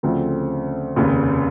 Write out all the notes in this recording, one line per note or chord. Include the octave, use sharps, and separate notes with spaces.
D2 C#3 F3 A3 C4
F1 D#2 C#3